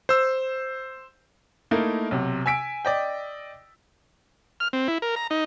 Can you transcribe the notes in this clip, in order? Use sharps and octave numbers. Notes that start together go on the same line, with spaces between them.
C5 E6
A3 A#3 D#4 E4 A#4
B1 C3
G#5 E6 B6 D7
D5 D#5 G5
F6
C4
E4
A#4
A#5
D#4